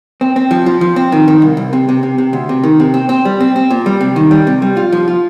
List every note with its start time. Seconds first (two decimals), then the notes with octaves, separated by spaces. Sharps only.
0.21 C4
0.36 C4
0.51 F3
0.66 F3
0.81 F3
0.96 C4
1.12 D#3
1.28 D#3
1.42 C2
1.57 C2
1.73 C3
1.89 C3
2.03 C3
2.18 C3
2.33 D2
2.49 C3
2.63 D#3
2.80 C3
2.94 C4
3.09 C4
3.25 G3
3.40 C4
3.56 C4
3.70 A#2
3.86 G3
4.01 C3
4.16 D#3
4.31 G3
4.47 C3
4.62 G3
4.77 F4
4.92 F3
5.08 F4